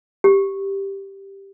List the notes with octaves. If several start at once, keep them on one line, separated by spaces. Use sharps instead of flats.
G4